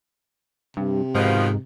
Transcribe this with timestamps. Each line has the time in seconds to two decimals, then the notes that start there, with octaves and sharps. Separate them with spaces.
0.77 G2 C3
1.15 G#2 B2 D#3 F3